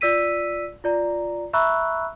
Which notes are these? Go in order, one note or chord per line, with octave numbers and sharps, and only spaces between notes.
F4 D5 E6 B6 D#7
F4 D5 A#5
E5 A#5 B5 C#6 E6 F#6